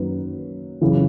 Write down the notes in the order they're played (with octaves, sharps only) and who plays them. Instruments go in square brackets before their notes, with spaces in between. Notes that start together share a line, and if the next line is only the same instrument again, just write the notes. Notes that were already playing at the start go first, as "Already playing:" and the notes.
Already playing: [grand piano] F#2 D#3 F#3 A#3 D#4 B4
F#2 C#3 E3